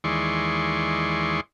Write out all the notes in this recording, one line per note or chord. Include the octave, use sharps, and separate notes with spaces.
D#2 E3 G#3 D5 C6 C#6